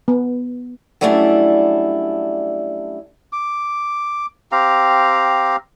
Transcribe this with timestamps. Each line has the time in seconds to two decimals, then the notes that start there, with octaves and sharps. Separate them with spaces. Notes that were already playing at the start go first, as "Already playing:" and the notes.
0.08 B3
1.01 F#3 G3 A3 C#4 D4 E4
3.32 D6
4.52 C4 G4 F5 A#5